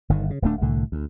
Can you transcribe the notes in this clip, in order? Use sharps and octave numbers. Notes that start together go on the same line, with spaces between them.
G1 D#3
C#3
D1 G2 A3 D4
C2 A2 D3
D2